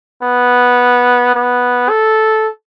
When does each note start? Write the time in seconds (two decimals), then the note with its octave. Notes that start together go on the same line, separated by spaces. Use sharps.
0.22 B3
1.34 B3
1.89 A4